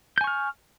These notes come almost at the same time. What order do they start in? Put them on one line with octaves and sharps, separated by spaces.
G6 G#5 C#6 F6